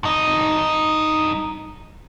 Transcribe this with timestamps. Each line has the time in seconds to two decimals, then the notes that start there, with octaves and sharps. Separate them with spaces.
0.03 G2 D#4